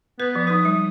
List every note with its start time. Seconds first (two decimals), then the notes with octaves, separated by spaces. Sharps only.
0.20 B3 B4
0.36 F3
0.47 D#4 B4 D#6
0.65 G3